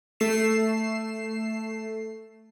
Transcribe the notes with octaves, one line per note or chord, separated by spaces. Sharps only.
A3 C7 E7